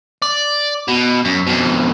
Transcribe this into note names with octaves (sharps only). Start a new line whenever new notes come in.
D5
B2
F#2
F2 B2